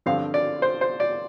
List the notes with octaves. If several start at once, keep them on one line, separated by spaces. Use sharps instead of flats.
G2 D3 F3 C4 F4 F5
D5
C5
C5
D5